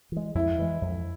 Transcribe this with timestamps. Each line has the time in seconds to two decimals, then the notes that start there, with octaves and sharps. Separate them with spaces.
0.12 E3 G#3
0.35 F2 E4
0.58 E3 G#3
0.82 F2